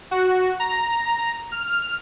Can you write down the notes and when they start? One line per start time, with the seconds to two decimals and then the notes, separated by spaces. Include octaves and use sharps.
0.11 F#4
0.60 A#5
1.52 F6